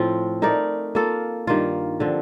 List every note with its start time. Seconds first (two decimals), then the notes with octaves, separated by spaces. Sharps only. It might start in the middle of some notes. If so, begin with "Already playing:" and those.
Already playing: A2 F3 C4 F4
0.42 A3 D#4 A#4 D5
0.95 A#3 F4 A4
1.47 G2 D#3 A#3 F4
2.00 D3 F3 C4